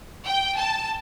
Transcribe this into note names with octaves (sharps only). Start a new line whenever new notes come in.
G5
A5